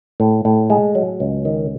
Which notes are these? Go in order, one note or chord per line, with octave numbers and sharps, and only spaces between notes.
A2
A2
G#3
F#3
C#2
D#3